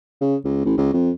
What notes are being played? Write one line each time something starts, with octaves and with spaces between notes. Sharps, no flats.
C#3
C#2
A1
C#2
F2